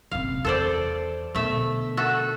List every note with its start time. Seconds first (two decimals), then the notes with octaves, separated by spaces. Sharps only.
0.11 F#1 C3 F5
0.45 E2 A4 C5 D5
1.35 B2 D3 A3 E5
1.97 F#4 A4 E5